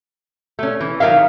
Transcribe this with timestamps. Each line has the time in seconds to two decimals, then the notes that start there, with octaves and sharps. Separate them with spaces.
0.59 A3 C#4
0.80 E3
1.00 D#3 F#3 A#4 E5 F5